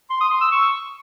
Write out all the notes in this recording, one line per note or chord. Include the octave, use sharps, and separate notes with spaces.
C6
D#6
C6
E6
C#6